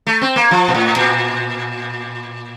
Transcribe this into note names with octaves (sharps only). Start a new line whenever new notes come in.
A3
C4
A#3
F3
A#2
A2
A#2